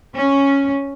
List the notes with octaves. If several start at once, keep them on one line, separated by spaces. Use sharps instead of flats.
C#4